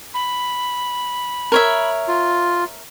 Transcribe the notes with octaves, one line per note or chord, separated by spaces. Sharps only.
B5
A#4 C#5 E5
F4